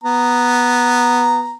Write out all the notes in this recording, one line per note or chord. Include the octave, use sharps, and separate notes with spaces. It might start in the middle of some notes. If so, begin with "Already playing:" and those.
B3 A#5